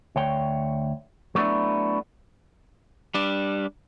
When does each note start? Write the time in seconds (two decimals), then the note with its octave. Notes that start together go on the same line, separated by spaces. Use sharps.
0.16 D2 C#5 G5
1.35 F#3 A3 B3 D4 E4
3.14 G3 D4